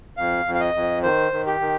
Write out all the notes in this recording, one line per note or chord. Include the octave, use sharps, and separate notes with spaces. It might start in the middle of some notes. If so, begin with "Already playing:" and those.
F2 F5
F2
F5
D#5
F2
D#3 C5
D#3
G4
D#3